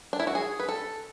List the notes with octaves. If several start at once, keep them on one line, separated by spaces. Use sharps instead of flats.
D4
E4
F#4
G#4
B4
A4